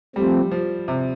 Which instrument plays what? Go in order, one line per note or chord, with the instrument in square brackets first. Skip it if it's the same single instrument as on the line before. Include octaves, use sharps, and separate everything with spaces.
[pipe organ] F3 A3 C4 [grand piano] G3
[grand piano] F3
C3